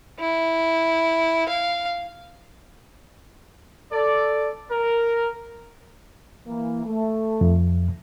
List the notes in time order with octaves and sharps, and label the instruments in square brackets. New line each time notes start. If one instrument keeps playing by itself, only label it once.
[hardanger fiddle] E4
F5
[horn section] A4 D5
A#4
[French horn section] E3 A#3
A3
[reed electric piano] F2